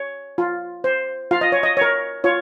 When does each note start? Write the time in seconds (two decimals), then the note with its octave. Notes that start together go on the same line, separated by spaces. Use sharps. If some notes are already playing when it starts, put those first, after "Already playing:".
Already playing: C#5
0.38 F4
0.84 C5
1.31 F4 F5
1.41 D#5
1.52 C#5
1.63 D#5
1.77 A#4 C#5
2.24 F4 C#5